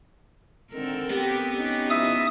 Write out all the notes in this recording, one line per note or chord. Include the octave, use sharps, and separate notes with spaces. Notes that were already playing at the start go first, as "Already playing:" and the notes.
D3 D#3 C4 A4 A#4
B3 G4
C#4 D#4
B2 F3 E4 E5 D#6